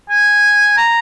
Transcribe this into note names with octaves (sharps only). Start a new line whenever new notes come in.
G#5
A#5